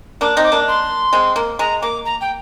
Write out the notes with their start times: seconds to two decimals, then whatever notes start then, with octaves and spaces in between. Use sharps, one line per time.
0.21 A#3 D4 D6
0.37 C4 D#4
0.44 D6
0.52 A#3 D4
0.68 C6
1.13 G#3 C4
1.36 A#3
1.59 G#3 A#5
1.82 A#3 D6
2.05 A#5
2.21 G5